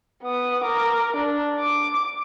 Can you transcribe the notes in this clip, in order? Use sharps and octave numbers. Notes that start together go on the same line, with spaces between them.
B3 D#6
A#4 D6
D4
D6